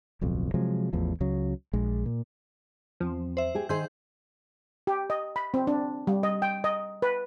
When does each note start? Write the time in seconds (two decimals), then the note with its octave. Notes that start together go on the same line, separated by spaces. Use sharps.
0.21 D1 B1 F2
0.54 C3 F3 F#3 G#3
0.93 A1 E2 A2 F3
1.20 C#2 C#3 F#3
1.73 A#1 G#3
2.06 A#2
3.00 E2 F3 C4
3.37 C5 E5
3.55 G4 G#4
3.69 D#3 G#4 C5 E5 C6 G6
4.87 G4
5.10 D#5
5.36 B5
5.54 C4
5.67 D4
6.07 G3
6.23 D#5
6.42 G5
6.64 D#5
7.02 B4